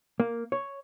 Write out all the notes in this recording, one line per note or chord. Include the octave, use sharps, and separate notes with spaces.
A#3
C#5